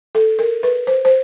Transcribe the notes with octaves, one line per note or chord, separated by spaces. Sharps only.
A4
A#4
B4
C5
C5